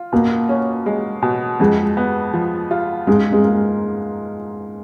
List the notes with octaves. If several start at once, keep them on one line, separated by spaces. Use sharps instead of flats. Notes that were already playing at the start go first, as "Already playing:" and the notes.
Already playing: F4
B2 A#3
C#4
G#3
B2
F2 G#3
B3
F3
F4
G#2 G#3
G#3
A#3